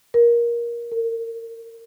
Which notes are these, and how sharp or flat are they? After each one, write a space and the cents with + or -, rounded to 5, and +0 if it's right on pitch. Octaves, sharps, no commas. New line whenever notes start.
A#4 +20
A#4 -30